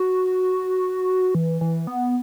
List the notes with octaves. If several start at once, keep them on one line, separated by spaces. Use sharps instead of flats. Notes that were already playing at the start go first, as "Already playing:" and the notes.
Already playing: F#4
E3
E3
B3